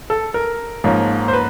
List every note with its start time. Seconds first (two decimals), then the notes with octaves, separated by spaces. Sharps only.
0.10 A4
0.34 A#4
0.84 G#2 F3 A#3 C#4
1.28 C5
1.33 B4